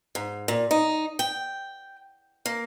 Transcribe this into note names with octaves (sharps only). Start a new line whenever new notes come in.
G#2
A#2
D#4
G5
A#3